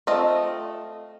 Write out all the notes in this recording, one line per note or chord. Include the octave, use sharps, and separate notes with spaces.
A3 C4 F4 D#5